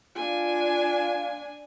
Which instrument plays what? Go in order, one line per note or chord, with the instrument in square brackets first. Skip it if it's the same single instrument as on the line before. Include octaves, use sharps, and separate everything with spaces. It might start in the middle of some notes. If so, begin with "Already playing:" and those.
[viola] D4 G#5 [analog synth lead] F4